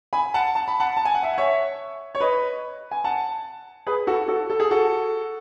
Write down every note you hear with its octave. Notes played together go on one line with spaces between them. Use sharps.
G#5 B5
F#5 A5
A5
B5
F#5 A5
A5
G#5
F#5
E5 G#5
F#5
C#5 E5
C#5
B4 D#5
G#5
F#5 A5
G#4 B4
F#4 A4
F#4 A4
A4
G#4
F#4 A4